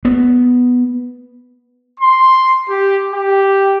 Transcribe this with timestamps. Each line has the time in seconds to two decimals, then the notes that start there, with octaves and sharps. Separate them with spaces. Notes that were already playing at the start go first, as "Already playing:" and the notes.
0.05 B3
1.99 C6
2.69 G4
3.14 G4